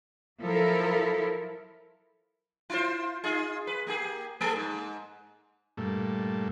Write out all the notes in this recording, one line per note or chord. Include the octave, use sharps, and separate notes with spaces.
F3 F#3 E4 A4 A#4
E4 F4 C5
D#4 F4 G#4
B4
A#3 G4 G#4
A3 G#4 A4
G#2
G2 A#2 A3